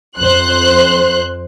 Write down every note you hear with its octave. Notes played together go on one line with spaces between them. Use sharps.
F2 C5 C6 F#6